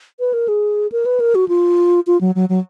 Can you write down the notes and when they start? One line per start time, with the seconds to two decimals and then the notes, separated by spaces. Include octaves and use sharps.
0.20 B4
0.33 A#4
0.48 G#4
0.92 A#4
1.06 B4
1.20 A#4
1.35 F#4
1.48 F4
2.07 F4
2.21 F#3
2.35 F#3
2.49 F#3